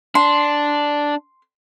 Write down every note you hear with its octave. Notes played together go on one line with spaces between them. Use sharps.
D4 C6